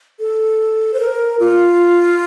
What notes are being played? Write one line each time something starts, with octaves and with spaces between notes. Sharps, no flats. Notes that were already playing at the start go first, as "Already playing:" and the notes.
A4
C5
A#4
F4